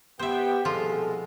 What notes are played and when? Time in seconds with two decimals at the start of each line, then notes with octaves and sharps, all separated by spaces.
0.19 B3 G4 C5 E5 G5
0.65 C2 B2 F3 G#3 F4 A4